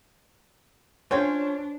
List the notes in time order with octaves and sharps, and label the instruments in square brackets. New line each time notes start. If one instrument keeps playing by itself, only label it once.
[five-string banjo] C#4 F4 G5 [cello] D4 [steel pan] C5 G#5 [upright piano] C#5